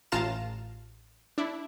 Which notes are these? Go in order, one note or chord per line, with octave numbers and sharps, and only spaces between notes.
A1 F4 F5 A5 A#5 E7
D4 E4